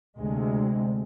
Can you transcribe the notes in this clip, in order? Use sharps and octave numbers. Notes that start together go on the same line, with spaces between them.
D2 C3 G#3